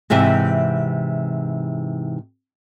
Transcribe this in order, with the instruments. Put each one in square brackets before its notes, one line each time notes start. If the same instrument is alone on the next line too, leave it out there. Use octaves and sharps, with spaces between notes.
[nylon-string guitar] G#2 C3 E3 E5 G5